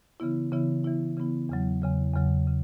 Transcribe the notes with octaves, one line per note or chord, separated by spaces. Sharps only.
C#3 E3 B3 E4
C#3 E3 B3 E4
C#3 E3 B3 E4
C#3 E3 B3 E4
E2 C#3 F#3
E2 C#3 F#3
E2 C#3 F#3
C#3